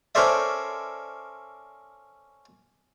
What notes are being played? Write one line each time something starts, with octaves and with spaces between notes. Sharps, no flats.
C#4 A4 A#4 C5 D5 E5